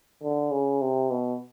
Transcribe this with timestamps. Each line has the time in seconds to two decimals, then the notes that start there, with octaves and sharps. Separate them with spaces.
0.23 D3
0.51 C#3
0.81 C3
1.11 B2